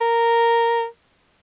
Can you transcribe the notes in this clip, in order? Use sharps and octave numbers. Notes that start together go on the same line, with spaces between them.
A#4